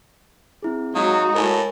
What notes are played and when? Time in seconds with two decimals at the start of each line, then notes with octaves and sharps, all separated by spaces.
0.63 C4 E4 G#4
0.95 F#3 G#3 D#4 F#4 F5
1.35 A2 A#4 G#5 A5